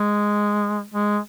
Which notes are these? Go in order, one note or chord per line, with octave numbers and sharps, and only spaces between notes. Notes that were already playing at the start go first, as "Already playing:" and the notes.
Already playing: G#3
G#3